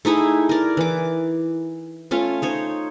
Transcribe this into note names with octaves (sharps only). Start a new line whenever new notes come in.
A3 D#4 E4 G#4
A#4 D5
E3 D6
A3 C#4 F4
D#4 C5 C#5